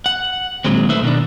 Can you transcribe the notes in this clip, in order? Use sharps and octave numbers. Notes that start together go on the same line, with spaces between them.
F#5
A#2 D#3 F#3 G#3 C4
A3 D#4 B4 C5 E5
B2 D#3 D4